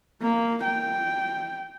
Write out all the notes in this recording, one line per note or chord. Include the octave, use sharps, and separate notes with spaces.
A#3
G5